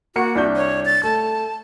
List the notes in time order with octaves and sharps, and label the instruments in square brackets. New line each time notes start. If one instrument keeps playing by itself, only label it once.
[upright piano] A#3 F#5 C#7 [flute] F#4
[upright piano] C2 D4 G6
[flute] C#5
A6
[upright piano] A3 [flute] A5